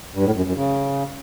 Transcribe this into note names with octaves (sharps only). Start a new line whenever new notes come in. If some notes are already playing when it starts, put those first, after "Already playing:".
G2
A2
F#2
F#2
C#3